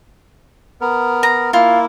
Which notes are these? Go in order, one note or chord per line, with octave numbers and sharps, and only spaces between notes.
B3 A#4
A#5
A#3 E4 F4